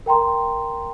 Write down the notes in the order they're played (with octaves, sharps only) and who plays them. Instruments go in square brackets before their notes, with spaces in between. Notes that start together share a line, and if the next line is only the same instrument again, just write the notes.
[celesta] A#4 G5 A#5 C6